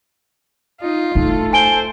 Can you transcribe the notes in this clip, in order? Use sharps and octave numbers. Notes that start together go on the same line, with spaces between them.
D#4 F4
A3 D#4 A4
C5 G#5 D7 G7